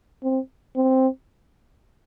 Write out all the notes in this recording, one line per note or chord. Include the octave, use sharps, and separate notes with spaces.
C4
C4